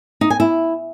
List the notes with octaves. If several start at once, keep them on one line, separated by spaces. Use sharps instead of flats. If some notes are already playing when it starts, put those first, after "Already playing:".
D#4
G#5
E4